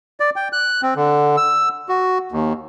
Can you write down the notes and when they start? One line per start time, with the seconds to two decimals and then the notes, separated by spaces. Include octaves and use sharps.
0.20 D5
0.36 G5
0.53 F#6
0.83 C4
0.96 D3
1.37 E6
1.89 F#4
2.32 D#2